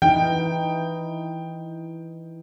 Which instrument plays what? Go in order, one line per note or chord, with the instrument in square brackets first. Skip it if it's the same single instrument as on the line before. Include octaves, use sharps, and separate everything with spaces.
[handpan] E3 D#4 E4 [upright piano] G5